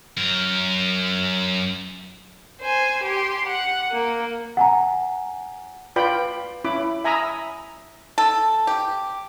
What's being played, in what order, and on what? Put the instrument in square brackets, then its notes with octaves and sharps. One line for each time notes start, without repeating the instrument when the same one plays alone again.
[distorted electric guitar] F#2 A#4
[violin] C5 G#5
G4 C6
F#5
A#3
[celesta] F#5 G#5 A#5
[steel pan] F4 B4 D5 G5 B5
C#4 E4 B5 D6
E5 G#5 A#5 B5 D#6 E6
[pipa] A4
G4